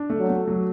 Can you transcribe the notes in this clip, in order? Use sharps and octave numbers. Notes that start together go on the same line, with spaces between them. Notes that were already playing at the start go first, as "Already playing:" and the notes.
Already playing: D4
A3
F#3
A3
F#3